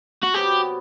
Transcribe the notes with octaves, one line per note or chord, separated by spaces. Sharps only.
F#4
C3 F#3 B3 G4